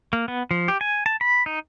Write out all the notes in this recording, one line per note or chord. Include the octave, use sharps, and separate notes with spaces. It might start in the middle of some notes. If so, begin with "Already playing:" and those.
A#3
B3
F3
G4
G#5
A5
B5
D#4